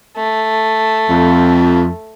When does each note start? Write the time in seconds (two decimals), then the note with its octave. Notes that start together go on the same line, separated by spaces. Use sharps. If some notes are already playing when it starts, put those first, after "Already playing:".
0.17 A3
1.10 F2